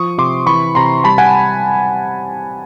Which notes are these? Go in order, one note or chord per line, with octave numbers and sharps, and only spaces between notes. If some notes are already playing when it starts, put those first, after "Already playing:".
Already playing: F3 C#6 D#6
C3 C6 D6
E3 B5 C#6
C3 A#5 C6
G3 A5 B5
F#5 G#5